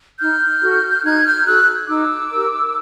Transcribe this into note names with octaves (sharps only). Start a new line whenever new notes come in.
D#4 F6 G6
F#4 A4
D#4 F#6 G#6
F6 G6
F#4 A4 E6 F#6
D#4 D6 E6
G4 A#4